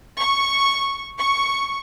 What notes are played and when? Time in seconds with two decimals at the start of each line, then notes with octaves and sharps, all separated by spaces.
0.18 C#6
1.20 C#6